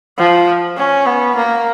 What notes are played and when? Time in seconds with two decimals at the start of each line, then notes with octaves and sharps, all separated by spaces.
0.18 F3
0.77 C#4
1.05 B3
1.36 A#3